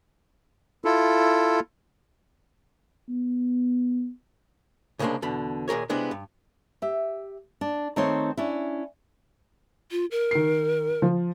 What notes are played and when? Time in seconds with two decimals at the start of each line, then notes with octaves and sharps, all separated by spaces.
0.85 E4 F4 A4
3.09 B3
4.99 C2 C#3 G#3 A#3 D4 C6
5.22 E2 B2 D3 B5
5.68 D#2 A#2 G#4 A#4 C#5
5.89 C3 G3 G#3 B3 D4 E4
6.11 G2
6.82 G4 E5
7.61 D4
7.96 D#3 A3 C4 D#4 C5 C#5
8.37 C#4 D4 E4
9.91 F4
10.11 A#4
10.31 D#3 C7
11.02 F3